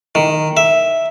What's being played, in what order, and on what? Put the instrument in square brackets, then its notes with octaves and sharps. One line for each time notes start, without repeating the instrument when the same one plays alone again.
[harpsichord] D#3
E5